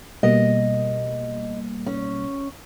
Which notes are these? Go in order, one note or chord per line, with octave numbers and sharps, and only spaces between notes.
B2 G3 A#3 D#5
C#4